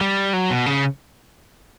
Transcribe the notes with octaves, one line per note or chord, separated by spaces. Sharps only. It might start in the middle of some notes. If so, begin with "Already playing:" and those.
G3
F#3
B2
C#3